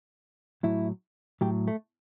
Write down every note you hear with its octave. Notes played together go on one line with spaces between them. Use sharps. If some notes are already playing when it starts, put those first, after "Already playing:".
A2 F#3 E4
A2 F#3 G4
A3